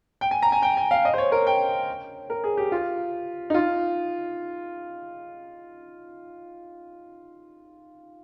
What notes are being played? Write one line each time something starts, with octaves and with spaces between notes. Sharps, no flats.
G5
G#5
A#5
G#5
G5
G#5
F5
D#5
C5
C#5
A#4
G5
A#4
G#4
G4
F4
D#4
F4